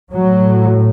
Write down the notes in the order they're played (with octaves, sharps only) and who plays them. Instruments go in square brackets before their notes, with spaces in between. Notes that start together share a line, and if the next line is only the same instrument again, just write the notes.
[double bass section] A2 F#3